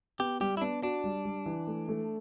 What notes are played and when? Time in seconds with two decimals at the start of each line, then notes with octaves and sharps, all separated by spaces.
0.19 B3 G4
0.40 G3 G4
0.57 E4
0.61 B3 D4
0.83 D4 F#4
1.04 G3
1.25 G3
1.46 E3
1.67 A3
1.89 A3